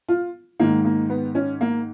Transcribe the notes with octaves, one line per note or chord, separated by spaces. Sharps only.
F4
G#2 D#3 A#3
A#3
B3
C#4
A#3